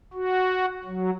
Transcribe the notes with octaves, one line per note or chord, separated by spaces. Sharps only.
F#4
F#3